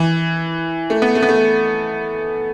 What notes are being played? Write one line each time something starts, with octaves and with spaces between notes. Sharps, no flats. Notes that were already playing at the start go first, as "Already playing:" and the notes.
Already playing: E3
A3
B3
A3
B3
A3